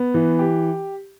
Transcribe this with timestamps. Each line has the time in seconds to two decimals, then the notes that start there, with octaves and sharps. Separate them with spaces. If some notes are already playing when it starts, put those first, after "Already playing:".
Already playing: B3
0.14 E3
0.39 G4